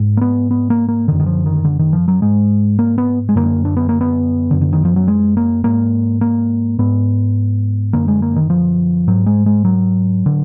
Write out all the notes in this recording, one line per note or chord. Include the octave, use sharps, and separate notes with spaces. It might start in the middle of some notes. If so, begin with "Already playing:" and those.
Already playing: G#2
A#3
B3
B3
A#3
A#3
F#2 D3 D#3
D#3
F3
D#3
D3
D#3
F3
F#3
G#2 G#3
A#3
B3
G#3
F#2 D3 A#3
D4
B3
A#3
B3
F#2 D3
D3
D#3
F3
F#3
G#3
A#3
G#2 A#3
A#3
G#2 B3
F#2 D3 A#3
G#3
A#3
D#3
F3
G#2 F#3
G#3
G#3
F#3
D3